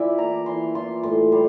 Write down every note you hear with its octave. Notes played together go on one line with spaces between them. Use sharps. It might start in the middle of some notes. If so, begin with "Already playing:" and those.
Already playing: E3 F4 D5 E5
A#3 A#5
E3 C6
F4 C6
A2 C6
G3 C6